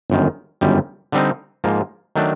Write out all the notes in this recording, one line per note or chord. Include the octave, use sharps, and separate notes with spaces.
G1 F#2 D#3
G1 F#2 D#3 G3
D3 G3 C4 D#4
G#2 F3 A#3
D#3 F#3 A3 D4